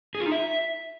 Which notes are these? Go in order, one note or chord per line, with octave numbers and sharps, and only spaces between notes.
G#4
F4
D#4
E5